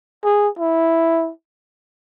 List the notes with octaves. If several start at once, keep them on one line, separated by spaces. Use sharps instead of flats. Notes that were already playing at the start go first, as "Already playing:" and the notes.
G#4
E4